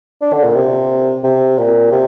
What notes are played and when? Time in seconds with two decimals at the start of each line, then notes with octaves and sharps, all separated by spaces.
0.21 D4
0.33 D3
0.44 A#2
0.55 C3
1.24 C3
1.58 A#2
1.92 C3